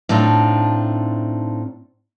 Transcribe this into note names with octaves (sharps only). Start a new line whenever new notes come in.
A2 C4 D4 D#4 F4